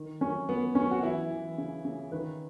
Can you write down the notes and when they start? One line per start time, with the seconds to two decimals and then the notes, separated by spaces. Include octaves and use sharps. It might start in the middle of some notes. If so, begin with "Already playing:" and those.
Already playing: D#3
0.21 F#2 C#4
0.49 F#2 B3
0.75 F#2 C#4
0.91 F#4
1.02 E3 E4
1.31 E3
1.58 C#3
1.85 C#3
2.12 D#3 B4